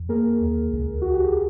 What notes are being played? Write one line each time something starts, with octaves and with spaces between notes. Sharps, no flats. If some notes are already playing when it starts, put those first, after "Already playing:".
Already playing: F2
A#3 G#4 A#4
D#2
C#2
C#2 F#4
G4
G#4